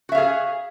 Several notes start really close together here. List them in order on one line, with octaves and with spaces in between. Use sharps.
F#4 E5 F5 G#4